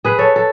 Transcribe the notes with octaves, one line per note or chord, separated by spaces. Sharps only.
G#4 B4
A4 C#5
A4